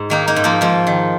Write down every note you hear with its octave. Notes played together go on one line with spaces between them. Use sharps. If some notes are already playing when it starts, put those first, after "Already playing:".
Already playing: G#2
D#3 A#3 D#4
A#3 D#4
G#2
F3 A#3
G#2 F3
D#3